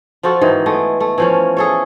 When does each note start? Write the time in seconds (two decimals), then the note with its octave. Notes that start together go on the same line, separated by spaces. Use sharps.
0.23 F3 F4 F#4 A4
0.41 G#2 D#3 E3
0.66 G#3 A3 B3
1.00 A3
1.18 E3 F3 C#4
1.57 G#4 A4 C#5